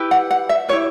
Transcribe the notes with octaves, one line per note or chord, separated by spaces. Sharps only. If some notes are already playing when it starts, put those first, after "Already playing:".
Already playing: E4 G4 B4
F#5
F#5
E5
E4 G4 B4 C#5